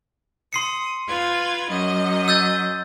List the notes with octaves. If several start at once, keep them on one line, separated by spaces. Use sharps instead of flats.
C6 D#6 C7 C#7
F4 B4 G#6
F#2 F#3 D#5
E6 G6 A6